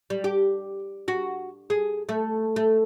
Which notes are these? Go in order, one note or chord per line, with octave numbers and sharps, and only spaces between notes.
G3
G4
F#4
G#4
A3
A3